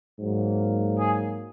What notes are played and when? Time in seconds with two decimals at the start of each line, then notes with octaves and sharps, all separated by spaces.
0.19 G#2 F#3 A#3
0.98 G#4